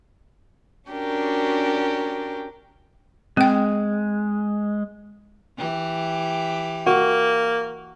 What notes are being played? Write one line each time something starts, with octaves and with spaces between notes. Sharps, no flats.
C#4 D4 F#4 G4 A#4
G#3 C4 G5
E3 G4
A#3 F#4